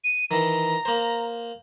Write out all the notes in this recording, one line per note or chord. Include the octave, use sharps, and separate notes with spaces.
D#7
D#3 E3 A#5
A#3 C5